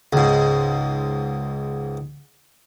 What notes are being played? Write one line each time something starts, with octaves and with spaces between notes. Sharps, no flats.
C#2 G#2